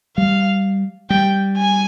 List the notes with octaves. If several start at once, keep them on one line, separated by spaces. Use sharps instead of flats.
G3 F5
G3 G5
G#5